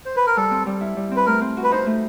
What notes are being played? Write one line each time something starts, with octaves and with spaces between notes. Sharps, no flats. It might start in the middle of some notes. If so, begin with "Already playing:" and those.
C5
B4
A#4
G3 A4
C4
G3
E4
G3
C4
B4
A3 A#4
C4
F#4
B4
D#4 C5
A3